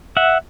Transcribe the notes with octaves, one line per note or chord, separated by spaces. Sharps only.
E5 F#5